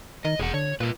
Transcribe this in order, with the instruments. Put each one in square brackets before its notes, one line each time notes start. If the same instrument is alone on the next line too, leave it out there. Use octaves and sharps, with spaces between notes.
[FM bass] D#3 [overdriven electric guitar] D#5
[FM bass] E1 [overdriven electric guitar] G#4 F#5
[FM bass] D3 [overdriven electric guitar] C#5
[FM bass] A#2 [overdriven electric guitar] F4 B4